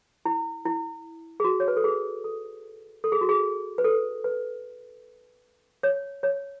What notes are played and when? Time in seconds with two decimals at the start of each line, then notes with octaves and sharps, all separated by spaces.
0.25 E4
0.65 E4
1.40 G#4
1.44 F#4
1.60 C#5
1.68 B4
1.77 A4
1.84 G#4
2.24 A4
3.04 A4
3.12 G#4
3.21 F#4
3.29 G#4
3.78 B4
3.84 A4
4.24 B4
5.83 C#5
6.23 C#5